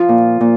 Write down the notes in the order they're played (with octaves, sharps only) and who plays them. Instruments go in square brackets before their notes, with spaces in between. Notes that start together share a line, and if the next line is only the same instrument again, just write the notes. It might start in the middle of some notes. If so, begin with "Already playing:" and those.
Already playing: [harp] F3 [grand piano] F4
[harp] A#2
A#2